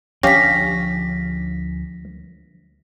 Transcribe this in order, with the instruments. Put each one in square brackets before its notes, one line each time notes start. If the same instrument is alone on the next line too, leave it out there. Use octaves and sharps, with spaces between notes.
[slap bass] D2 F3 D4 [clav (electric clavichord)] C#4 G4 F5 [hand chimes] A#6 B6